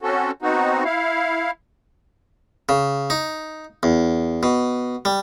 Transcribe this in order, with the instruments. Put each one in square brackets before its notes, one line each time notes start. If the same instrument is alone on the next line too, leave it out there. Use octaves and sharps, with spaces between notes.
[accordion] C4 C#4 F#4 A4
B3 C4 D#4 F#4
E4 F5
[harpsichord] C#3
D#4
E2
B2
G3